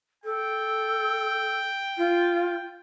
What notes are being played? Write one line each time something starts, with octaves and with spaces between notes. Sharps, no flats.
A4 G5
F4